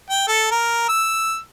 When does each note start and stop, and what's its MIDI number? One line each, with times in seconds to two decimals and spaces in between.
0.10 0.27 79
0.28 0.47 69
0.51 0.87 70
0.89 1.38 88